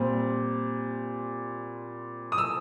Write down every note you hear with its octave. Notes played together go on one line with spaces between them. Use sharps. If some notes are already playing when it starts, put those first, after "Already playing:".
Already playing: A#2 G3 C4
D#6
E6